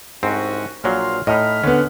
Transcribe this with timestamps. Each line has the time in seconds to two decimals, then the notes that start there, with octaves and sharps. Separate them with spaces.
0.23 C2 G#2 C4 C#4 F#4
0.84 A#1 A#2 F#3 C6 F6
1.27 A2 D#4 D#5 B5 F6
1.63 D3 B3 C#4